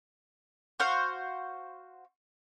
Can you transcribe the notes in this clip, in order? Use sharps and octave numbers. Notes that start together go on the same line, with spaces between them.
F#4 C5 F5